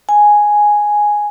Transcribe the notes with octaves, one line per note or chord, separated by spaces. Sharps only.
G#5